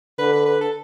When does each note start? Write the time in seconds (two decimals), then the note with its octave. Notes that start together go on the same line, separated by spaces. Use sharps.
0.19 D3 B4
0.33 B4
0.46 B4
0.61 A4